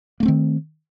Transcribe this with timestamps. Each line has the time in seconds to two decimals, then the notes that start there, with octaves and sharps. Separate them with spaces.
0.20 A#3
0.23 A3
0.25 C4
0.28 D#3